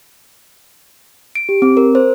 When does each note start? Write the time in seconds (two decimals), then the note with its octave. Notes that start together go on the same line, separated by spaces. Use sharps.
1.35 D7
1.49 G4
1.62 C4
1.77 A#4
1.95 C5